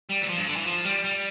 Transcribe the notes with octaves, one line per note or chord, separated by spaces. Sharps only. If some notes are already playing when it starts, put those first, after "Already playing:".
G3
E3
F3
G2
D3
E3
F3
G3
G3